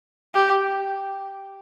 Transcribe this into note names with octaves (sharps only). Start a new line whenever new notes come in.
G4